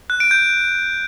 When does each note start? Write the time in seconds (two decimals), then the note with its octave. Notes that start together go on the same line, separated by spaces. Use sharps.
0.10 F#6
0.20 D7
0.31 G6